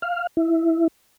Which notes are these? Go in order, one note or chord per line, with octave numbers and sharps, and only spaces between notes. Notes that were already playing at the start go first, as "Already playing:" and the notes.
F5
E4